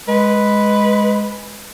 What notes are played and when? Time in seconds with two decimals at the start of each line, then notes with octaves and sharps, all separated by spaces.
0.08 G#3 B4